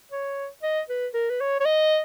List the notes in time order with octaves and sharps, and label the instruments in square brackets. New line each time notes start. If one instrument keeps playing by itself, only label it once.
[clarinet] C#5
D#5
B4
A#4
B4
C#5
C#5
D#5